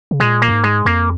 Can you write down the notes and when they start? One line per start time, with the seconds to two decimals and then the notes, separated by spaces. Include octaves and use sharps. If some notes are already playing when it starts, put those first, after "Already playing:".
0.11 C#3
0.20 A#2 G#3
0.42 A#3
0.48 F2
0.52 G#2
0.64 G#3
0.85 F2 A#3